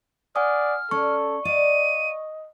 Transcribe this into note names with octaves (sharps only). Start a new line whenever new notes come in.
D5 F#5 G#5 D#6 F6
C#4 A4 D5 C#6
D5 D#5 F5 D#7